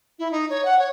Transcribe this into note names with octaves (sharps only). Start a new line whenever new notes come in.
E4
D#4
C#5
F#5
C#5